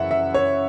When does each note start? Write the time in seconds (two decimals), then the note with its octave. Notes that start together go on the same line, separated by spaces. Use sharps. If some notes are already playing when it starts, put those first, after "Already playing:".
Already playing: F#2 C#3 E3 E5 F#5
0.11 E5
0.34 C#5